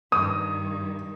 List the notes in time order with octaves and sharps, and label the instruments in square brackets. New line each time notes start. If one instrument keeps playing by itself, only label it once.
[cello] G2 D#3 [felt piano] D#6